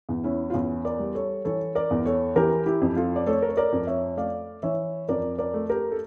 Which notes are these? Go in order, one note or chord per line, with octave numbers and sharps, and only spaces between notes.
E2
C#4 E4
F4
E2 C#4 E4
A#4 D5
G3
A4 C#5
E3 A4 C#5
A#4 D5
E2
A4 C#5
E3 G4 A#4
E4 G4
F2
F4 A4
D5
A3 A4 C#5
A#4
C#5
A#4 D5
F2
C#5 E5
A3 D5 F5
E3 C#5 E5
F2 A#4 D5
A#4 D5
A3
G4 A#4
A4